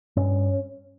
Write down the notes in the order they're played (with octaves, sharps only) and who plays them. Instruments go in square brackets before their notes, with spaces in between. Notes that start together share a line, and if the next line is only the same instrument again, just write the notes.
[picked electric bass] G2 C#4